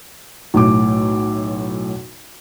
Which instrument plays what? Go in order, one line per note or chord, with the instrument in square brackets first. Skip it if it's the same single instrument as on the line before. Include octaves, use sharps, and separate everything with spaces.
[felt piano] B1 A2 D6